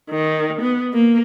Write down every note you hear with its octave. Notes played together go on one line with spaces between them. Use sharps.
D#3
B3
A#3